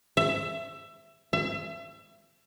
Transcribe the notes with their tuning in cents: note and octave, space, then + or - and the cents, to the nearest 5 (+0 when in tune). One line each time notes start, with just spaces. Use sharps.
E5 +20
E5 +35